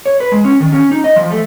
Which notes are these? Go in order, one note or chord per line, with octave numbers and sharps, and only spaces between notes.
C#5
B4
G#3
C#4
D#3
C#4
D#4
D#5
F3
A3